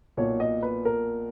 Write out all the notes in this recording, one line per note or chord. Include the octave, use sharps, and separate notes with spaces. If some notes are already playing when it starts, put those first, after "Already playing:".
B1 A#2 C#5
D#5
B4
A#4